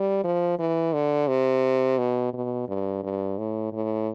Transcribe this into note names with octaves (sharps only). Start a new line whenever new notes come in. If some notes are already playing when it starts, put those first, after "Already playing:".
Already playing: G3
F3
E3
D3
C3
B2
B2
G2
G2
A2
A2